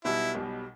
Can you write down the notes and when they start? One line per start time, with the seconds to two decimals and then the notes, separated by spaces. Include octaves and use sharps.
0.04 B1 B2 G3 E4
0.35 B1 B2 G3